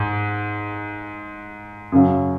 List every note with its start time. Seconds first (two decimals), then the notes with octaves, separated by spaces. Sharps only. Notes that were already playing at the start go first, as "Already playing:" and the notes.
Already playing: G#2
1.92 F#2 C#3 F#3